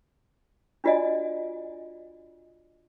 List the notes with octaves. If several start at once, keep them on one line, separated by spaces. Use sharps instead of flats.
D4 F4 F#4 D5 D#5 G#5